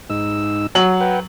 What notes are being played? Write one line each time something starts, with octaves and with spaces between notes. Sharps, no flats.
G#2 D#4 E6
F#3 F#7
B4 F#5 G5